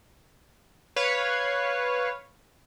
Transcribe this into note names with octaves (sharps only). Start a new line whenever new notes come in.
B4 C#5 F5